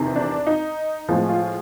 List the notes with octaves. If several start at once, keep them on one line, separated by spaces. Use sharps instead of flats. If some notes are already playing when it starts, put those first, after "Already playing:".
Already playing: E2 C3 D#3
D4
D#4
A2 F3 G#3
F4